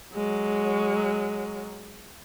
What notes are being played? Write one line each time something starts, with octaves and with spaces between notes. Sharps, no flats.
F#3 G#3